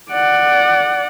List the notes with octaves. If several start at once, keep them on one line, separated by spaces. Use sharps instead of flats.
D5 F#5